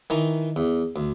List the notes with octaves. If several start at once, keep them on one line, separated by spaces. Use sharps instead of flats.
D#3 E3 A#5
E2
D2